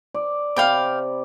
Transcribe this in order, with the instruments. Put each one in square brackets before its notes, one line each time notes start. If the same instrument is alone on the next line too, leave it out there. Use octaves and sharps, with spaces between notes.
[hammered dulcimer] D5
[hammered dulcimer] C3 B5 [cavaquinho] F5 G5 D6